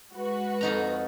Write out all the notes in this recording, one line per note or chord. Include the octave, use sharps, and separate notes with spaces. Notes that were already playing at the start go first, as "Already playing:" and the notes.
G#3 F#4 B4
F2 D#4 A#5